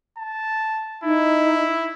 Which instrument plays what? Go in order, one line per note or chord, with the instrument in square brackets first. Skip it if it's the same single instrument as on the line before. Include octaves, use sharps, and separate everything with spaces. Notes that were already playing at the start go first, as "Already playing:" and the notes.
[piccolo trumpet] A5
[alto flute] D#4 [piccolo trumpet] E4